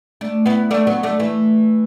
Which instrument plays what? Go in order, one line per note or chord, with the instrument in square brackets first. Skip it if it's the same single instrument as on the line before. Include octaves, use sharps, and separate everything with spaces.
[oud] A3 D4
B3 E4
A3 D4
F#3 B3
A3 D4
E3 A3